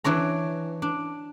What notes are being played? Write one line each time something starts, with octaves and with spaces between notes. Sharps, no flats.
E3 D4 C#5 A#5
D4